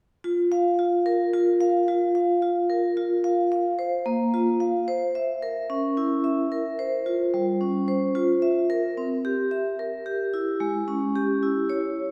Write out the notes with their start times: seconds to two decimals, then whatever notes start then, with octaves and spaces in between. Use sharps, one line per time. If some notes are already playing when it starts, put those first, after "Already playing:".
0.24 F4
0.52 F5
0.79 F4
1.06 A#4
1.33 F4
1.61 F5
1.88 F4
2.15 F5
2.42 F4
2.70 A#4
2.97 F4
3.24 F5
3.52 F5
3.79 C5
4.06 A#3
4.34 F4
4.60 F5
4.88 C5
5.15 E5
5.42 A#4
5.70 C#4
5.97 E4
6.24 E5
6.52 A#4
6.79 C5
7.06 F4
7.34 G3
7.61 C#4
7.88 C5
8.15 F4
8.42 E5
8.70 A#4
8.97 C4
9.25 G4
9.51 E5
9.79 A#4
10.06 G4
10.34 E4
10.60 G#3
10.88 C#4
11.16 G4
11.43 E4
11.70 C#5